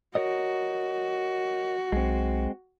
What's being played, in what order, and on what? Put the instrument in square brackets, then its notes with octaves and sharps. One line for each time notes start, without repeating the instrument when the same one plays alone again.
[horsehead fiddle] F#4 [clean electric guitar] A#4 C#5 D#5
[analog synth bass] B1 [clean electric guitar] G#3 C4